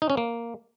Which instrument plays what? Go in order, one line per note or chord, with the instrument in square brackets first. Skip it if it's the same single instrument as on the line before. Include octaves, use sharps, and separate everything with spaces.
[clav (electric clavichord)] D#4
C#4
A#3